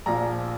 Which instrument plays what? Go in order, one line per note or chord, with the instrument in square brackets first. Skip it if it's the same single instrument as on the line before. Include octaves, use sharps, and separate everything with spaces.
[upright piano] A#1 A#2 F3 A#5